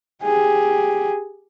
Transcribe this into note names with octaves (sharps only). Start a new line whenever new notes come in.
G4 G#4